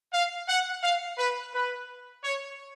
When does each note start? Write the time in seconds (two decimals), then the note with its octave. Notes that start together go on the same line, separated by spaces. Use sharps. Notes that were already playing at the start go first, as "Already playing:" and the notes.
0.12 F5
0.48 F#5
0.82 F5
1.18 B4
1.53 B4
2.24 C#5